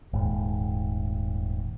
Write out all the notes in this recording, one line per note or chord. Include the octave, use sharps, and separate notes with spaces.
D#1 G#2